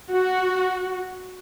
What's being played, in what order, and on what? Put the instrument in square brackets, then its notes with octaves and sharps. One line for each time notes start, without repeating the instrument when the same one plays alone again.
[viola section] F#4